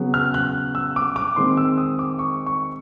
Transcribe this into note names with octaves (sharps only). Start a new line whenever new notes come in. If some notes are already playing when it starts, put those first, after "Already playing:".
Already playing: C#3 F#3 B3
F6
F#6
E6
D6
D6
D#3 G#3 C4 C6
E6
D#6
D6
C#6
C#6